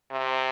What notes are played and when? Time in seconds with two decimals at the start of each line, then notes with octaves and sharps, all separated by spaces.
0.12 C3